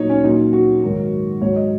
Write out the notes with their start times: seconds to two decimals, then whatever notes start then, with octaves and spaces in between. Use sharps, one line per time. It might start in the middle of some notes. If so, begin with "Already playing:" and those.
Already playing: A#2 F#3 D#4 C#5
0.09 C#4
0.24 A#2 F#3 D#4
0.53 F#4
0.83 G#2 D#3 F#3
1.42 G#2 F#3 C#5
1.56 D#5